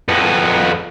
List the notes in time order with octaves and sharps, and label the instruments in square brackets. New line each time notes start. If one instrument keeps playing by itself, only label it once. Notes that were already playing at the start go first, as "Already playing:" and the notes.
[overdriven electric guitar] F2 B3